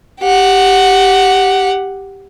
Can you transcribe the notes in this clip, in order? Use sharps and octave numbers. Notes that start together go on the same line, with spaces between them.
G4 F#5